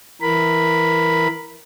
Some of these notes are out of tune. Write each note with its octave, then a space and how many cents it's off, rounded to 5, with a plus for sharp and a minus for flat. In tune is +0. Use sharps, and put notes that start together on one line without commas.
E3 +0 A#4 +0 B5 +0